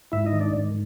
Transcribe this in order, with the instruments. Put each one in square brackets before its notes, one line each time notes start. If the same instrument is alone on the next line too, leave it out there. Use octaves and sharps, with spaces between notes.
[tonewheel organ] G#2 E4 E5
D#4 D#5
D#3
D4 D5
G#2